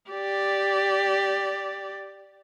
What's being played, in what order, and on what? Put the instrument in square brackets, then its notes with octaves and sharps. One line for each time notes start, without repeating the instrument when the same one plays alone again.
[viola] G4 D5